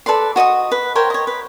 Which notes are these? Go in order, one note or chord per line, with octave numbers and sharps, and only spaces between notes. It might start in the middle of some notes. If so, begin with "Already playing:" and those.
A4 B4 D5 C6
F#4 D#5 C#6 D#6
B4
A#4 C5 C#5 G5
C#5 D#5
B4